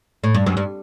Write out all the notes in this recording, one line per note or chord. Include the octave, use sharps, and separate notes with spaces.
A2
G2
F#2
G2